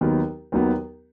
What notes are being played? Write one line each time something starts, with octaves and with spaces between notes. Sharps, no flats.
D#2 D#3 F#3 B3
D#2 D#3 F#3 B3